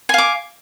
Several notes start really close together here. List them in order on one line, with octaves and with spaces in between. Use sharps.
G#5 F5 D6